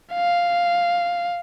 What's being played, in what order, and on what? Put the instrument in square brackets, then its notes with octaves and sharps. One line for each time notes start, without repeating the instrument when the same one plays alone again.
[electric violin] F5